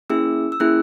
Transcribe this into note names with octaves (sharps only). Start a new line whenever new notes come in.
A#3 C#4 E4 G#4 E6
E6
A#3 C#4 E4 G#4 F#6